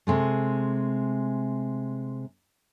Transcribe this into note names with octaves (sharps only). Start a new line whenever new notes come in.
C3 G#3 A3